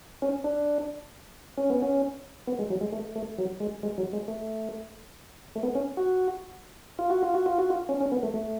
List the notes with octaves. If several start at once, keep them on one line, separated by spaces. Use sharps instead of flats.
C#4
D4
C#4
B3
C#4
B3
G#3
F#3
G#3
A3
A3
F#3
G#3
G#3
F#3
G#3
A3
A3
B3
C#4
F#4
F4
F#4
F4
F#4
F4
F#4
F4
C#4
C#4
B3
A3
A3